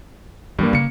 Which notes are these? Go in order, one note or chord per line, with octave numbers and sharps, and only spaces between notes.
G2 E3 G3 A#3
C#3 A#3 C#7